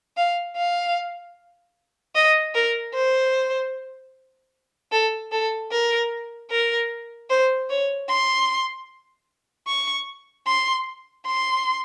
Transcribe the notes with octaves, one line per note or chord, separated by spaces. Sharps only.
F5
F5
D#5
A#4
C5
A4
A4
A#4
A#4
C5
C#5
C6
C#6
C6
C6